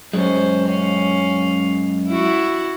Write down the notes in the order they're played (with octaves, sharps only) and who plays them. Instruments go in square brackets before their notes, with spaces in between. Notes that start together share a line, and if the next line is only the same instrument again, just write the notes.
[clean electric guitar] F#2 G#3 [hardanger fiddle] C#4 C5
[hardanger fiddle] C#4 F5
E4 F#4